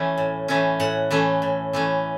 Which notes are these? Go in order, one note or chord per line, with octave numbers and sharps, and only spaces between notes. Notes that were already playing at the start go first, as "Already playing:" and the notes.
Already playing: E3 A3 C#4
A2
E3 A3 C#4
A2 F#5
E3 A3 C#4
A2
E3 A3 C#4